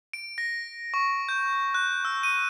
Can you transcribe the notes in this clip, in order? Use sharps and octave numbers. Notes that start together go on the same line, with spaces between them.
D7
A#6
C#6
G6
F#6
E6
D#7